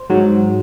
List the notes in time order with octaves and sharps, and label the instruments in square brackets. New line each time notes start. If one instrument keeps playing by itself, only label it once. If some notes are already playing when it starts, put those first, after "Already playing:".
Already playing: [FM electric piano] C5
G#2 F#3